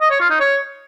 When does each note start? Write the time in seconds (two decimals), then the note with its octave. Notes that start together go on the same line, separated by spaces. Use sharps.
0.01 D#5
0.11 C#5
0.20 F4
0.30 D#4
0.40 C#5